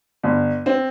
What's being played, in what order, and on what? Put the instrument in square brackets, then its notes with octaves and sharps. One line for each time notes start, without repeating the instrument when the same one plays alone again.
[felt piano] G1
C4